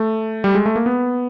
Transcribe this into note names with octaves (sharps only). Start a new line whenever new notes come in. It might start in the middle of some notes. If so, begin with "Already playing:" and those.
Already playing: A3
G3
G#3
A3
A#3
B3